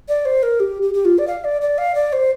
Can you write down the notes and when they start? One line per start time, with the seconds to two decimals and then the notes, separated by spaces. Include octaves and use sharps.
0.08 D5
0.25 C5
0.42 A#4
0.59 G4
0.82 G4
0.93 G4
1.05 F4
1.18 D5
1.27 F5
1.44 D5
1.61 D5
1.78 F5
1.95 D5
2.12 C5